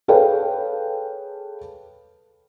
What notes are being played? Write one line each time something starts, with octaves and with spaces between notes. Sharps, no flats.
G#4 A4 B4 C#5 F5 G5